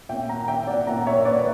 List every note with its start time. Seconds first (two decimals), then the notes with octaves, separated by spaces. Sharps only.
0.09 A#2 A#3 C#4 E5 G5
0.29 F#5 A#5
0.48 E5 G5
0.67 D5 F#5
0.87 A#2 A#3 C#4 F#5 A#5
1.07 C#5 E5
1.17 C#5
1.25 B4 D5